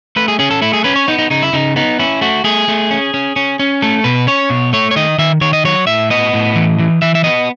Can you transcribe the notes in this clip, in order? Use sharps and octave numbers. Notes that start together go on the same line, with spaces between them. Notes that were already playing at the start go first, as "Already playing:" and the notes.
A3 B4
G#4
C#4 G#4
A4
A3 E4
G#4
C#4 B4
C#5
B3 D#4
D#4
C#3 D#4
E4
C#3 D#4
B3 D#4
C#4 E4
A3 F#4
A3 G#4
A3
C#4
C#4
C#4
C#4
A3 A4
B2 B4
C#4 C#5
B2
A3 C#5
C#5
D#3 D#5
D#3 E5
D#3 C#5
D#5
F#3 C#5
A2 E5
B3 D#5
A2
E3
E3
E3 E5
E5
B3 D#5